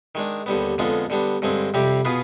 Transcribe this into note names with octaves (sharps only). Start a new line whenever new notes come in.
D#3 G#3 D4
D#2 D3 G3 B3
F2 D3 G#3 B3 F4
D3 G3 B3 D4
G2 D3 G#3 C4
F2 C3 G3 C4 G4
B2 B3 F4 G#4 B4